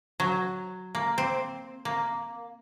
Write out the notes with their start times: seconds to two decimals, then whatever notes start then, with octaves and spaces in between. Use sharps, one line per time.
0.20 F#3
0.95 A#3
1.18 C4
1.85 A#3